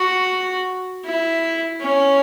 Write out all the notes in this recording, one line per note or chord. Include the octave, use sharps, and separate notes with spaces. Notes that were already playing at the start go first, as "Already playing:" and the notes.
Already playing: F#4
E4
C#4